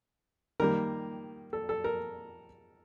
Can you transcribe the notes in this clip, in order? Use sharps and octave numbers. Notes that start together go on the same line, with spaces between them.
D#3 G3 A#3 A#4
A4
A4
A#4